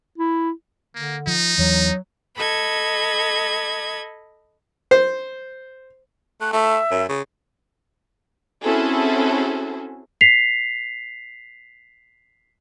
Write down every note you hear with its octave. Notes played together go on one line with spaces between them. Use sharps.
E4
D3 A#3
F3 D#4
E2 E3 F#3
A4 D#5 B5 G#6
C5
A3 F#6
A3 E5
F#2
C#3
C4 C#4 E4 F#4 G#4 A4
B6 C7 F7